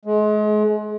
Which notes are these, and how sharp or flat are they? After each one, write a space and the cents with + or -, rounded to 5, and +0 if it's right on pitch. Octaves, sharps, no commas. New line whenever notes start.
G#3 +35